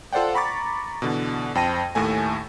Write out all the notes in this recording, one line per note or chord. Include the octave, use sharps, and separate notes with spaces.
F4 A4 C5 D5 F#5 G5
A#5 B5 C#6 D6 A6
B2 D3 E3
F2 C5 G5 A5 A#6 D#7
D#2 A2 A3 G#5